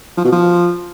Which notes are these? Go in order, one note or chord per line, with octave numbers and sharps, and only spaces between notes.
F3
B2
F3